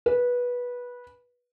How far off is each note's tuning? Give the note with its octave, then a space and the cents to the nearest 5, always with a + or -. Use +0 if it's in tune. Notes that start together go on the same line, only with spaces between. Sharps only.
B4 -15